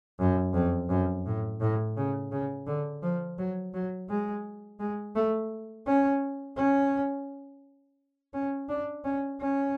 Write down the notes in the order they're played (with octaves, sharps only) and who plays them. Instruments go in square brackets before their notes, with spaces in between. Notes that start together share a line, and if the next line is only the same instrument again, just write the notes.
[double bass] F#2
F2
F#2
A2
A2
C#3
C#3
D3
F3
F#3
F#3
G#3
G#3
A3
C#4
C#4
C#4
D4
C#4
C#4